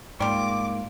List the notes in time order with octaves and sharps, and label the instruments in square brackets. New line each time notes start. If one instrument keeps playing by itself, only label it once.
[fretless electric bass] G#2 [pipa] G3 F4 [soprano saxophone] A#3 [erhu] D6